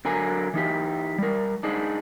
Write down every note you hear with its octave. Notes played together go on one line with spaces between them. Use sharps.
D3 F#3 A#4 G#5
E3 D#4 G4
G3 A#4
D4 D#4 G#4